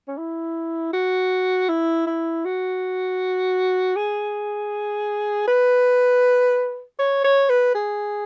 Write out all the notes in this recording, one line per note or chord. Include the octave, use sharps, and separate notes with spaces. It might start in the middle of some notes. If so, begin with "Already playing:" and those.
C#4
E4
F#4
E4
E4
F#4
G#4
B4
C#5
C#5
B4
G#4